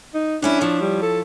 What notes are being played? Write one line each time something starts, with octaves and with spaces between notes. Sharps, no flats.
D#4
F#2 C#4 D4 E4
F3 E4 C#5
G3
A4